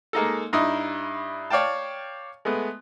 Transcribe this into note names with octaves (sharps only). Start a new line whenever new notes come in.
G#3 A#3 D#4 A4
G2 D#4 E4 D#6
C#5 D5 F5 G5 A5
G#3 A3 B3